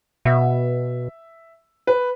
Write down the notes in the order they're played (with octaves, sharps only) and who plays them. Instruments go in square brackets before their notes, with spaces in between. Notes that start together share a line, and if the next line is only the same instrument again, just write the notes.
[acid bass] B2 [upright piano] E5
[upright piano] B4